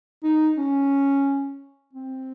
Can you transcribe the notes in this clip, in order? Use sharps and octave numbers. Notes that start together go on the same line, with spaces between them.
D#4
C#4
C4